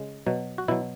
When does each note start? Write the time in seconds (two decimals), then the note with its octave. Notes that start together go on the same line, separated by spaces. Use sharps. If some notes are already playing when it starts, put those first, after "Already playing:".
Already playing: C#3 G#3
0.26 B2 F#3
0.58 F#4
0.68 B2 F#3 E4